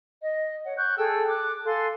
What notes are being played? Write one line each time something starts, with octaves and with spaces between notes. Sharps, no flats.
D#5
C#5 F#5
C#6 F#6 G6
G#4 A4 G5 E6
D6 F#6
A4 F5 G#5 C6